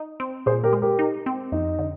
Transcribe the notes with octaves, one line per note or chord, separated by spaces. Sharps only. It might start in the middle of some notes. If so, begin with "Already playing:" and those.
Already playing: D#4
C4
A#2 G#4 C5
G4 A#4
G#3
G4 A#4
D#4
C4
F2 D#4
D3